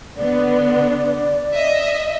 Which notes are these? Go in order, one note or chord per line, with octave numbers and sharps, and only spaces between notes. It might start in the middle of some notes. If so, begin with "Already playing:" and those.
D3 B3 D5
D#5 E5